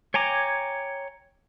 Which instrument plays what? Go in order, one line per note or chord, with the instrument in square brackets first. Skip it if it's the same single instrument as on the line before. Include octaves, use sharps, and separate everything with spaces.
[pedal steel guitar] C#5 G5 G#5 A#5 D6